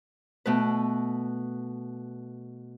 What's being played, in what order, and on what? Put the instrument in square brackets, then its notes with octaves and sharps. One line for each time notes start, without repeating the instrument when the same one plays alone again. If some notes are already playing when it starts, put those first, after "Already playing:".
[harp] B2 A3 B4